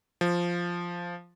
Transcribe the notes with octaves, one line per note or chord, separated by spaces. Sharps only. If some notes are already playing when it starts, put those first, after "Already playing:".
F3